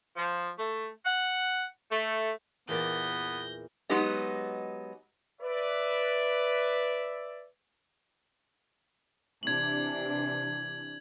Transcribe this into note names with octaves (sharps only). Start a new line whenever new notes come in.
F3
A3
F#5
A3
E2 A#2 B3 D5 G6 A#6
F#3 G#3 B3 D#4 G4 D#5
B4 D5 E5
C3 E3 D4 G#6 F#7